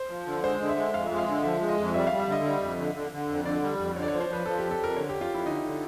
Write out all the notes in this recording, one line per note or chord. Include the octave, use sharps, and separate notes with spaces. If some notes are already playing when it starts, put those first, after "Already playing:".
Already playing: C5
F3
D3
G#3 C5
D3
E5
G#3
F2 F5
G#3 E5
F5
D3
F3 E5
G#3
D#5
F2
G3 E5
F5
G3
E5
D3 D#5
G3
F2
D3
D3
D3
F2
D3 D5
G3
F2
D3 C#5
D5
C#5
F3
C5
F3 B4
F3 A4
F2 G4
A4
F2 A#4
D3 C#5
G4
F2
F4
F2 E4
D3 D#4
D3